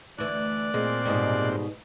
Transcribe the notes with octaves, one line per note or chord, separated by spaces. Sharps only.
D2 E3 D5 F#6
A#2 G#3 C4
G#2 B2 G3